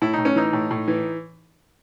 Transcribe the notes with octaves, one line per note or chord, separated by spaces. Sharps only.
A2 E4
A2 D#4
C#4
E3 D#4
A2
A2
E3